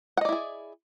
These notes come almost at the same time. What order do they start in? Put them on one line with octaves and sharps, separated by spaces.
F#5 D#5 D5 E4 G#4